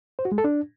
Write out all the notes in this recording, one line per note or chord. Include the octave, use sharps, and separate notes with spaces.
C5
F#4
G#3
A4
D4